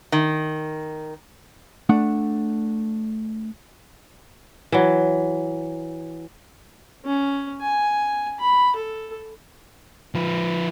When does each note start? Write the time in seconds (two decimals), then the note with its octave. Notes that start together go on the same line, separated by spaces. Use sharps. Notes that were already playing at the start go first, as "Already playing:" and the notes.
0.12 D#3
1.89 A3 D4 F#5
4.72 E3 F#3
7.05 C#4
7.61 G#5
8.40 B5
8.76 A4
10.15 F3 B4